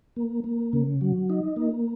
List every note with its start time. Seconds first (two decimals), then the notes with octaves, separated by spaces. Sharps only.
0.16 A#3
0.44 A#3
0.73 C#3
1.01 F#3
1.30 D#4
1.56 A#3